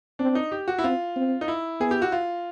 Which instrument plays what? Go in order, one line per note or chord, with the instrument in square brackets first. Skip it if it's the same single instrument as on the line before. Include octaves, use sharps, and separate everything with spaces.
[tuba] C4 [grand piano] D4
[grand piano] D#4
G4
F#4
E4
[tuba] C4 [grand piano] F4
[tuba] C4
[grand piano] D#4
E4
[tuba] B3 [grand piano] G#4
[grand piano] G4
F#4
F4